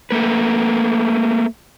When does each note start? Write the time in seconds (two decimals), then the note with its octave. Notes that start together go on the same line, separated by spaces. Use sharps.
0.11 A3 A#3 B4